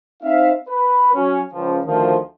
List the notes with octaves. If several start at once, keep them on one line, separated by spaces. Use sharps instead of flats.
C4 D#4 E5 F5
B4
F#3 C#4
C#2 F3
D2 D#3 F3